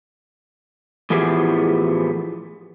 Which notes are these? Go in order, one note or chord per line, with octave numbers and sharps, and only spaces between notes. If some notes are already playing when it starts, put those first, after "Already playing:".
A2 E3 F3 B3 G4 G#4